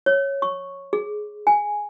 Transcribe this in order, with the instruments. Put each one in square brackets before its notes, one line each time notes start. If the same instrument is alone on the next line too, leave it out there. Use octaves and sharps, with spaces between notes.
[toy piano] C#5
C#6
G#4
G#5